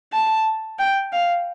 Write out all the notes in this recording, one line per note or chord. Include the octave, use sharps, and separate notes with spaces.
A5
G5
F5